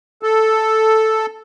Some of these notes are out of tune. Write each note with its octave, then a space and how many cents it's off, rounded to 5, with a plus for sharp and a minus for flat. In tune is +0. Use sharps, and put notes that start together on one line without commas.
A4 +0